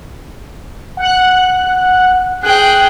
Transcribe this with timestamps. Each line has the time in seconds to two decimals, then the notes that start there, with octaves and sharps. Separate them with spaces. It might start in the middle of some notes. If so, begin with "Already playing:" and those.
0.97 F#5 F#6
2.43 G#4 G5 F#6